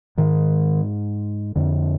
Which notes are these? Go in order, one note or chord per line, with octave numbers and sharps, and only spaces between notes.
G#2 D#3
F2 D3